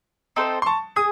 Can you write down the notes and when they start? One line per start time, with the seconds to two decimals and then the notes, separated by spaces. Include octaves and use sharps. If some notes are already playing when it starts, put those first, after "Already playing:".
0.36 C4 D#4 A4 C5
0.62 C6
0.66 A5 C#6
0.96 G#4 D#6